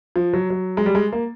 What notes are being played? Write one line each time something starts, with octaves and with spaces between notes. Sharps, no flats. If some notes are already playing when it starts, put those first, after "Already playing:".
F3
F#3
F#3
G#3
G3
G#3
A#3